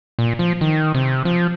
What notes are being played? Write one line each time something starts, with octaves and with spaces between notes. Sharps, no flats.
A#2
F3
D#3
C3
F3